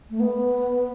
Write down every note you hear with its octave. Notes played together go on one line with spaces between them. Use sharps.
A3
B3